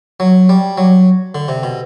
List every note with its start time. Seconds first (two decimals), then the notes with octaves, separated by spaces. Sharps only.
0.20 F#3
0.49 G3
0.77 F#3
1.35 D3
1.48 C3
1.63 B2